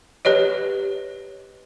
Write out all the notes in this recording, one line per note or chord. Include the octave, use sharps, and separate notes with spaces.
G4 B4 C#5 D#5